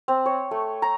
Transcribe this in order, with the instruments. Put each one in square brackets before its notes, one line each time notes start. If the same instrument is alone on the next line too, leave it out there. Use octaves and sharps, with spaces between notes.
[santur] C4
C#5
A3
A#5